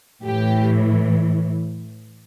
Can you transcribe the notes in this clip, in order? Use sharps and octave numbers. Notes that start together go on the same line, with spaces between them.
A2 E3 G4